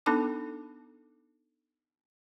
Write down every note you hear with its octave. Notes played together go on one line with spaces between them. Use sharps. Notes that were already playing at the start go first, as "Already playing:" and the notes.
B3 D4 D#4 A4 A5 D6